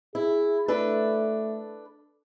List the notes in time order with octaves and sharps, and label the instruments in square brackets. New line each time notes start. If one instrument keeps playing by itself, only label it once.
[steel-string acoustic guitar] E4 [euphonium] G#4
[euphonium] A3 [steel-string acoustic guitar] D4 A4 B4